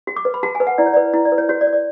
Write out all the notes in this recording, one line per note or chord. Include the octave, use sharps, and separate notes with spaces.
F#4
D6
B4
B5
F#4 A5
G#5
B4
F#5
E4 D5
C#5
B4 D5
E4
D5
B4
C#5
F#4 C#5
D5
C#5
D5